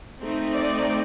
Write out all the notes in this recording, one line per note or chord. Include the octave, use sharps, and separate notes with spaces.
A3 C4 D#4
D5